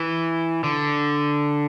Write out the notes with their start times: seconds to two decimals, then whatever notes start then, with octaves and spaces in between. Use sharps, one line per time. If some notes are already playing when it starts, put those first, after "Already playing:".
Already playing: E3
0.64 D3